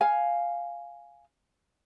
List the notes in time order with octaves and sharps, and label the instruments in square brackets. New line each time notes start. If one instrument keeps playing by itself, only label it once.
[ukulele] F5 G#5